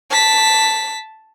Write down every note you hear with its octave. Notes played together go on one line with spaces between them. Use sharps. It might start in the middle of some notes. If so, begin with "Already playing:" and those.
A5 B6